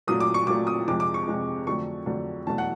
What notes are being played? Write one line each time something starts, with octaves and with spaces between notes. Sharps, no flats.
A#2 F#3 A3 D#6
D6
C#6
A#2 F#3 A3 D6
D#6
F2 C3 F3 G#3 D6
D6
C#6
F2 C3 F3 G#3
F2 D3 F#3 A3 C#6
F2 D3 F#3 A3
E2 B2 F#3 A3 A5
F#5